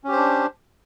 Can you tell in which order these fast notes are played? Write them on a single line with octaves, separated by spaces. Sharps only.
C#4 G4 C5 D4